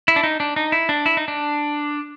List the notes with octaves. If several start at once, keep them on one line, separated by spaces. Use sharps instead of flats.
E4
D4
D#4
D4
D#4
E4
D4
E4
D#4
D4